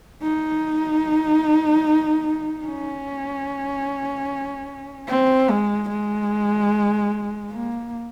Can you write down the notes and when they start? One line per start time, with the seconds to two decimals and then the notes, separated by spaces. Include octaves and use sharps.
0.22 D#4
2.66 C#4
5.08 C4
5.50 G#3
5.90 G#3
7.51 A#3